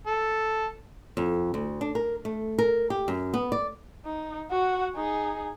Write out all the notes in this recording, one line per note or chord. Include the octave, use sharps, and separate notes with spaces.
A4
F2
D2
D4
A#4
A3
A#4
G4
F#2
B3
D5
D#4
F#4 F#5
D#4 G#4